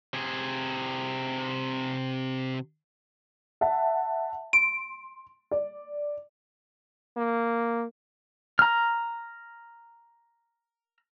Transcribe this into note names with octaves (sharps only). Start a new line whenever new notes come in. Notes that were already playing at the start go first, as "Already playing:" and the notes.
C3 G#4
E5 F#5 A5
C6 D7
D5
A#3
A#5 F6